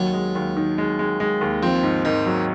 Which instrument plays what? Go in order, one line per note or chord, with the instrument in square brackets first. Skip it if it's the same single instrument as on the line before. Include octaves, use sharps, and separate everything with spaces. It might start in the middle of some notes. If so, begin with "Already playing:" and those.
Already playing: [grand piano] D#2 [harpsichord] F#3
[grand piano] G#3
D#2
D#3
G#3
G#3
G#3
D#2
[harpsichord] F3 [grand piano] C4
[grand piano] G#2
[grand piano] G#2 [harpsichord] D#3
[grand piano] F#3